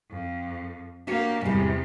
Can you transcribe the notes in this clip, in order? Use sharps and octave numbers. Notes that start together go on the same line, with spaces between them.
F2
A#3 D4 F#4 G4 C#5
E2 G#2 C3 G3